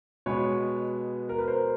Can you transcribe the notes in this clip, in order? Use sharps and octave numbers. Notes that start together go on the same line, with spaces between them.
B2 G#3 B3 B4 C#5
A#4
B4
A#4 C5